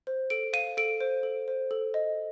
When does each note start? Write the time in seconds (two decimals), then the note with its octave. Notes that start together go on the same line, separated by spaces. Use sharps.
0.07 C5
0.30 A4 D7
0.53 F5 D#7
0.77 A4 D7
1.00 C5
1.23 A4
1.48 C5
1.71 A4
1.94 D#5